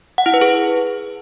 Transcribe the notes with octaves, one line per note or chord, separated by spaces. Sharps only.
F#5
E4
B4
G#4